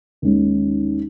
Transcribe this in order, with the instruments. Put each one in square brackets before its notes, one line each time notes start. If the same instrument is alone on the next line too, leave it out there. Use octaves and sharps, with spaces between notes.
[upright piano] D#2 D#3 G#3 C#4